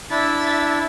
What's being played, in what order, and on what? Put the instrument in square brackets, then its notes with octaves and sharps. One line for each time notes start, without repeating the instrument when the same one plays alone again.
[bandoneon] D4 E4 [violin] E5 A6